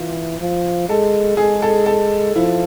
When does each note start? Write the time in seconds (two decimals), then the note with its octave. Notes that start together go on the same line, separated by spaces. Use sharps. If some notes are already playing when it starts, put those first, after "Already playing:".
Already playing: E3 F4
0.40 F3
0.89 G#3 A4
1.37 G#3 G#4
1.62 A4
1.86 A4
2.36 F3 E4